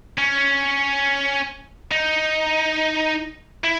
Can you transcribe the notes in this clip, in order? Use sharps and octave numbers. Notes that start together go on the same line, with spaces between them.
C#4
D#4
E4